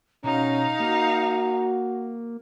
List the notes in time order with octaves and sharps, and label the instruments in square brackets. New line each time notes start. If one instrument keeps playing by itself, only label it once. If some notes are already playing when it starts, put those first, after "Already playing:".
[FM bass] B2 [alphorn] C#4 [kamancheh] D#4 F5 [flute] A#5
[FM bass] A#3 [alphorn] F#4